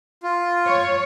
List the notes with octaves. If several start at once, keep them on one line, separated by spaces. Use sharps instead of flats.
F4
C#5